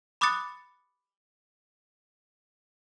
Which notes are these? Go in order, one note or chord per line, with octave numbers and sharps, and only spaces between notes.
B5 D6 D#6 F#6 A6 C#7